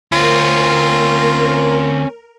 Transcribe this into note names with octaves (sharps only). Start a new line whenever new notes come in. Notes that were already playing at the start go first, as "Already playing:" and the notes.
D2 C4 C#4 F4 A#4